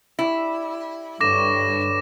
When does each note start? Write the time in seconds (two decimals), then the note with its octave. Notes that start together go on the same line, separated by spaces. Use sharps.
0.19 E4 G4 D5
1.21 G2 D3 B4 C#5 D6 A#6 E7